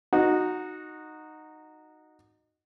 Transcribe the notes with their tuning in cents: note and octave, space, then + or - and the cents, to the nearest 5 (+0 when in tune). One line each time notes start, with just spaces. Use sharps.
D#4 -10 F#4 -10